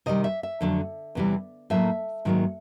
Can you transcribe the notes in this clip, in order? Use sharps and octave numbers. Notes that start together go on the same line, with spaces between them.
C3 D#3 G3 D#5
E5
E5
F2 D3 F#3 A3
E2 C3 E3 G3
A2 F#3 A#3 E5
G#2 D#3 F#3 A#3